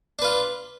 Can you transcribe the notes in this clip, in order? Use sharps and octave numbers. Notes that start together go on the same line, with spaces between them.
D4 F4 B4